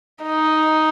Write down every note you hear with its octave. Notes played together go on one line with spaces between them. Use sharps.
D#4